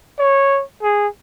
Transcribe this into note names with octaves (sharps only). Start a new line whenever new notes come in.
C#5
G#4